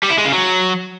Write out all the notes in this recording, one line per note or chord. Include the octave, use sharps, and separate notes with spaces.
G3
E4
G#3
C#3
F#3